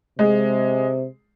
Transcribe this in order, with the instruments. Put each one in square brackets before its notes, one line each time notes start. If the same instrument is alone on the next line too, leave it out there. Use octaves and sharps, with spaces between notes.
[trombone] C3 [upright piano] G#3